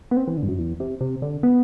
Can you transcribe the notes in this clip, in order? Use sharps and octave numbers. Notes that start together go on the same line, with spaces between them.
B3
C4
E3
D3
G2
F#2
E2
C3
C3
D3
B3